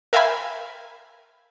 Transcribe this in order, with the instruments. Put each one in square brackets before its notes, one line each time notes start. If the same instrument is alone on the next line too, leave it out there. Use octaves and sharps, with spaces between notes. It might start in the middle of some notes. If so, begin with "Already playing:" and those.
[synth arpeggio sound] A#4 E5 F5 G5 G#5 B5